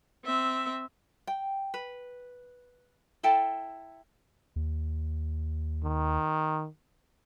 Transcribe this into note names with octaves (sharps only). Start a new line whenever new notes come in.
C4 E5
G5
B4
E4 A4 G5 A5
D#2
D#3